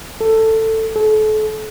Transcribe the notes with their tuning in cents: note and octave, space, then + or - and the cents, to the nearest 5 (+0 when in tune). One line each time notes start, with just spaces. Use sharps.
A4 +15
A4 -35